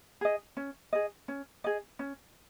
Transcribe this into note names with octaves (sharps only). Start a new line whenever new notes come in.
G#4 D#5
C#4
G#4 D#5
C#4
G#4 D#5
C#4